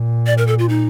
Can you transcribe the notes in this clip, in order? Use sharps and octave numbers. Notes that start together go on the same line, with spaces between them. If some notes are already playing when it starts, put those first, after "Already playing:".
Already playing: A#2
D5
A#4
A4
F4
D#4